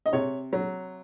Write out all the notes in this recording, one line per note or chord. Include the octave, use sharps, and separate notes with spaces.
D#5
C3 C#5
F#3